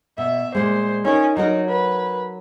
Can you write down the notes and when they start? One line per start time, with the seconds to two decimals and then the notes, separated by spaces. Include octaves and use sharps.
0.18 B2 E5
0.55 A#2 G#3 C5
1.05 C#4 D#4 F4 A#4
1.37 F#3 D#4 F#4 A#4
1.69 B4